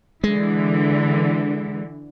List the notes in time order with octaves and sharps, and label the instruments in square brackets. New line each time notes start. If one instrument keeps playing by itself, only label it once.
[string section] D3 E3 [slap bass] G#3